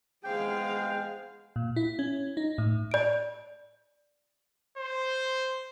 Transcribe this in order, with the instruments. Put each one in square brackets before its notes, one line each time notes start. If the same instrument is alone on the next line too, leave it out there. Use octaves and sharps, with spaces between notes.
[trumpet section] G#3 B3 C5 [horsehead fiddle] G#4 F5 [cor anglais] G5
[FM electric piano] A#2
E4
C#4
D#4
A2
[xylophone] D5 D7
[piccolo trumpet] C5